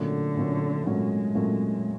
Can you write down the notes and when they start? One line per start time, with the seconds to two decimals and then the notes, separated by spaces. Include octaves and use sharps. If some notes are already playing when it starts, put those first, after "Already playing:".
Already playing: A#2 D3 F#3 A3 C#4
0.37 A#2 F#3 A3 C#4
0.86 A#2 F#3 G#3 A3 C#4
1.35 A#2 F#3 A3 C#4